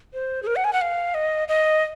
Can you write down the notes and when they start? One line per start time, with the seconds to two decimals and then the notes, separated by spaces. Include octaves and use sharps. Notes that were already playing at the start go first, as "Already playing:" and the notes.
0.13 C5
0.43 G#4
0.47 A#4
0.56 F#5
0.64 G#5
0.73 F#5
0.81 F5
1.14 D#5
1.48 D#5